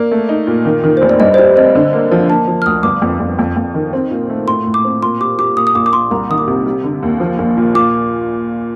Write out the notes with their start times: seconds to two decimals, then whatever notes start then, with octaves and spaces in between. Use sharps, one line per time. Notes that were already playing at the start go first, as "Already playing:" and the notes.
Already playing: A#3 D5
0.11 A3
0.29 D#4
0.47 A#2
0.65 D#3
0.84 D#3
0.97 F1 C5
1.09 D5
1.20 G2 D#5
1.34 C5
1.38 G3 D5
1.56 C4 D#5
1.75 D3
1.93 A#3
2.11 F3
2.29 A#3 A5
2.48 F3
2.62 F6
2.66 D2 D#6
2.83 G1 D6
3.02 F2
3.20 F2
3.39 F2
3.57 F2
3.74 D#3
3.93 C4
4.11 A#2
4.29 A3
4.47 A2 C6
4.66 A2
4.74 D6
4.84 C4
5.02 A#2 C6
5.20 G3 D6
5.38 G3 D6
5.56 A#2 D#6
5.67 D#6
5.75 A#1 D6
5.86 D6
5.93 A#2 C6
6.11 C2 A#5
6.30 D#3 D#6
6.38 D6
6.47 C3
6.66 G3
6.84 D3
7.03 D#2
7.20 F3
7.39 A#1
7.57 A#2
7.74 A#2 D6